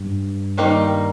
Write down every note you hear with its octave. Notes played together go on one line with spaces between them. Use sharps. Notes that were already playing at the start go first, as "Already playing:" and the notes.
Already playing: G2
D#3 G3 A#3 D#4